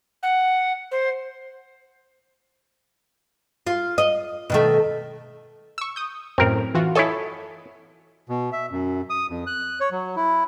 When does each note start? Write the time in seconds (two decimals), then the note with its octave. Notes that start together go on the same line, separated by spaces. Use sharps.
0.23 F#5
0.91 C5
3.67 F4
3.98 D#5
4.50 B2 D#3 A3
5.78 C#6 E6
5.96 D#6 G6
6.38 F#2 A2 C4 A#4
6.74 E3 F4 F#4
6.95 E4 A4 C#5 D#5 G#5
8.29 B2
8.52 E5
8.71 F#2
9.10 D#6
9.29 F2
9.47 F#6
9.80 C#5
9.92 F#3
10.16 E4